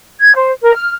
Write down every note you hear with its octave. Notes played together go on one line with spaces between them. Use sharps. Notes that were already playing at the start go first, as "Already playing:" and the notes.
G#6
C5
A#4
F6